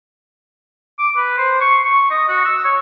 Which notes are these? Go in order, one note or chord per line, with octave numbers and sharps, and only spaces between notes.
D6
B4
C5
C#6
C#6
D#5
F#4
E6
C#5